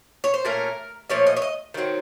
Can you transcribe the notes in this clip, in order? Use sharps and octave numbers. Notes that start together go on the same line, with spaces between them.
C#5
C5
A#2 A3 C#4 A#4
A#2 F3 A3 C#4 C#5
D#5
C#5
D#5
D#3 F#3 C4